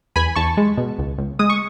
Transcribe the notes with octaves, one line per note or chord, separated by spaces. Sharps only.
E2 G#5 B5
E2 A5 C#6
G#3
B2
C#2
C#2
G#3 D#6
C#6